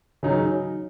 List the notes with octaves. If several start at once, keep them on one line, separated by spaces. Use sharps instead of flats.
C#3 F#3 D#4